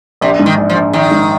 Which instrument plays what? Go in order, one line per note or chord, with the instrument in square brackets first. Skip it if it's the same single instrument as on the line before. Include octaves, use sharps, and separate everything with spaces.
[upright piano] A#1 [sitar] C3
[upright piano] G#2
[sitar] D#3
[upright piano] A#1
[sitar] F3
[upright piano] A#1
[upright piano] A#1 [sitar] D#3
[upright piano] G#2